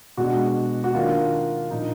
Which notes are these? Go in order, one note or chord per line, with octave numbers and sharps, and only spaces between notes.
B2 G#3 D4 F#4
F#4
D#3 A#3 D4 F4
A#2 F3 A#3 D4 D#4